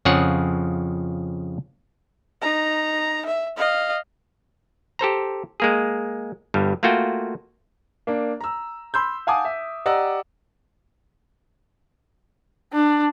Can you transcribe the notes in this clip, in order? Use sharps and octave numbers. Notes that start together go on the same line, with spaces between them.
F2 C#3 F3 G#4 C#5 F#5
D#4 A#5
E5
D#5 F5
G4 A4 C5 A#5
G#3 A#3 G#4
G1 G2 G3
A3 A#3 F4 F#4 G5
A#3 D4
A#5 E6
B5 C6 E6 G6
F5 F#5 G#5 A5 D6 D#6
E5
G4 D5 D#5 F#5 A#5 E6
D4